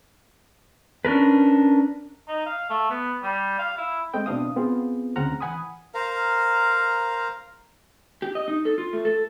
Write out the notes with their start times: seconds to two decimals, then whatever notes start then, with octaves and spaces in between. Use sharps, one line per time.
1.05 C#4 D4 A#4 B4
2.28 D#4
2.46 F5
2.70 A3
2.90 B3
3.22 G3
3.59 F5
3.78 E4
4.14 G#3 A3 C4 D#5 G5
4.26 B2 C4 D4 E4 F5 D#6
4.56 B3 C4 F4 G#4
5.16 D2 C#3 C4 F#5 A#5 F6
5.41 E3 F#5 G#5 B5 D#6
5.94 A#4 C5 F5 A#5
8.22 G4
8.35 D#5
8.48 D#4
8.65 A4
8.78 F4
8.93 A3
9.05 A4